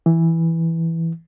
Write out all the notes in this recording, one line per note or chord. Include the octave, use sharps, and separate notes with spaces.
E3